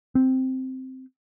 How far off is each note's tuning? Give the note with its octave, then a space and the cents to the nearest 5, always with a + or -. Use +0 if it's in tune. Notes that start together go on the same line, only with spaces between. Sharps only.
C4 -5